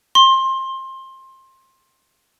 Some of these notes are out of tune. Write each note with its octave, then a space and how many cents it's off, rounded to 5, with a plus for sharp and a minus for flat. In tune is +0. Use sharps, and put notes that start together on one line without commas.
C6 +20